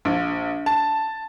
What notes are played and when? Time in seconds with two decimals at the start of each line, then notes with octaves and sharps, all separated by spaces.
0.05 A#1
0.66 A5